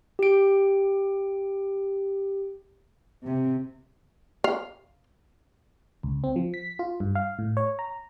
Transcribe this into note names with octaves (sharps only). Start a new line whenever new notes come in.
G4 D7
C3
F5
C#2
C4
F3
B6
F4
G2
F5
A2
C#5
A#5